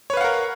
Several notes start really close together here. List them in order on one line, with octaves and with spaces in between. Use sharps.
C#5 B4 F5 F#5 A#4